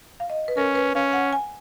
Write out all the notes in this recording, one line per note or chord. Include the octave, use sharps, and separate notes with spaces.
F5
D#5
B4
C#4 A#4
B4
C#4 F5
F#5
G#5